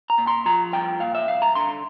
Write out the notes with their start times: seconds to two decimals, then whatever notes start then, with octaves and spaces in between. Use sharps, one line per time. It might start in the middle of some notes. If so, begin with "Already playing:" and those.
0.10 A#5
0.18 A#2
0.27 C6
0.46 F3 A#5
0.73 G2 G5
1.00 A#2 F5
1.15 E5
1.28 C2 F5
1.42 A#5
1.55 D3 C6